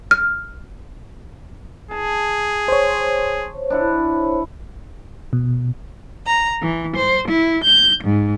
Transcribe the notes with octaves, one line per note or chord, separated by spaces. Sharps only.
F6
G#4 A5
C5 C#5
D4 E4 F#5
B2
A#5
E3
C5
E4
G6
G#2